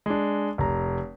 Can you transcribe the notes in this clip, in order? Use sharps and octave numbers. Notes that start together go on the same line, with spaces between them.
G#3 D4
F1 A#5